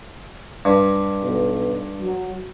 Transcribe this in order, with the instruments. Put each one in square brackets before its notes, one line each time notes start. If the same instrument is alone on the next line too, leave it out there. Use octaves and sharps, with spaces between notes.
[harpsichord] G2
[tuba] B1
F#3